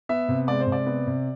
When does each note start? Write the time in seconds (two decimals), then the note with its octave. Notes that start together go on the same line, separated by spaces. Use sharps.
0.09 B3 E5
0.28 C3
0.48 G#3 D5
0.60 C5
0.67 C3
0.72 D5
0.86 B3
1.07 C3